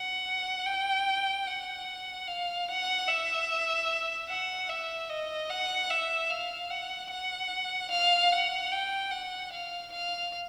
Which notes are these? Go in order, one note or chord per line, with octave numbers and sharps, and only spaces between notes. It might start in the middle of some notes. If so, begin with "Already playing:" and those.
Already playing: F#5
G5
F#5
F5
F#5
E5
F#5
E5
D#5
F#5
E5
F5
F#5
F#5
F5
F#5
G5
F#5
F5
F5